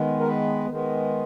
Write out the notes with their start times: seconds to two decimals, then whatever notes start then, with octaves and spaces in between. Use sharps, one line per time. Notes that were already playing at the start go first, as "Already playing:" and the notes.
Already playing: D#3 G#3 B3
0.20 A#4
0.28 B4
0.69 D#3 G#3 B3